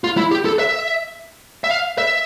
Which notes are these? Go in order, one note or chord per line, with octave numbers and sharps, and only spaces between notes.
F4
E4
G4
A4
E5
E5
F5
E5